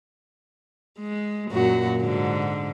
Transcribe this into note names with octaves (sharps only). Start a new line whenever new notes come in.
G#3
F#2 A#2 F#4
G#2 D3